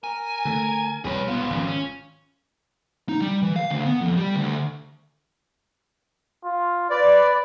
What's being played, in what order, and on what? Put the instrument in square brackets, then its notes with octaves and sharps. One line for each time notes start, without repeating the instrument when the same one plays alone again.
[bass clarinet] A#4 [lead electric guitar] G#5
[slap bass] D3 A3
[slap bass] E1 C2 G3 [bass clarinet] F#3 [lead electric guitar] G#4 B4
[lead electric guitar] G#2 B3 [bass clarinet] F4
[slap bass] G#1 [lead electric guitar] F2 C#3
[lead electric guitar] C#4
D#4
G3
E3
F5
D2
B3
F2
G3
D2
[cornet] F4
[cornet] B4 [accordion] D5